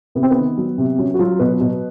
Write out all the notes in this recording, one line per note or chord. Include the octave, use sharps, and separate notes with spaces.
C3 B3
C4
B3
D#3
F#3
C3
F#3 C#4
F#4
F#3 F4
B2 B4
B2